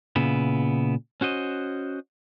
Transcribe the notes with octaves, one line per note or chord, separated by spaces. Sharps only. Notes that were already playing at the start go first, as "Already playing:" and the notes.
A#2 C#3 B3 E4
C#4 F#4 C5 D#5